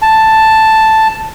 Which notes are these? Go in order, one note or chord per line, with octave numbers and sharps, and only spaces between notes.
A5